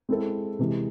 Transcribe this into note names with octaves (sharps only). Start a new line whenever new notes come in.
G#3 C4 E4 A4
C3 E3 G#3